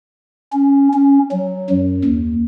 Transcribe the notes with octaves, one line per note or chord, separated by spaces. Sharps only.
C#4
C#4
F#3
F#2
D#2